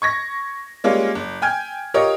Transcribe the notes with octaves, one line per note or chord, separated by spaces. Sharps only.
C#6 G#6 A#6
G3 G#3 A#3 C#4 F4
F#1
G5 G#5 F6 G#6
F4 G4 A#4 C#5 D#5